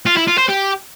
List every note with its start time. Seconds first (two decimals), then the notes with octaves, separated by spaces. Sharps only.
0.06 F4
0.17 E4
0.27 F4
0.38 C5
0.48 G4